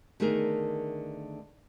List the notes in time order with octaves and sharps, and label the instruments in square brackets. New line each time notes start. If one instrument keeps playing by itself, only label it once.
[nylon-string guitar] D3 D#3 A3 B3 G#4 A#4